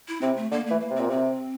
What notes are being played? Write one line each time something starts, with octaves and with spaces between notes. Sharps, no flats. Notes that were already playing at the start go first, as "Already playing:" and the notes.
E4
C3 C4
A3
D3 A#3
E3 A3
A#3
C3
A#2 C4
C3 C4